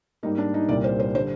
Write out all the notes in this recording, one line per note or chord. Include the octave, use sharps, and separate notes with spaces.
G#2 G3 A#3 D#4
D4
D#4
C2 A#2 G3 A#3 D5
C5
C5
D3 G3 C5